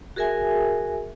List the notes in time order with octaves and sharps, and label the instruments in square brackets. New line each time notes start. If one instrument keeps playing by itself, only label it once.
[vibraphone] F#4 G#4 A#4 E5 G#5